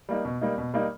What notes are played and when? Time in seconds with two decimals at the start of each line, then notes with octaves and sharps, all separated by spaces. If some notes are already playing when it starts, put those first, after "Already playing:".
0.09 G3 A#3 D#4
0.25 B2
0.41 G3 A#3 D#4
0.58 B2
0.74 G3 A#3 D#4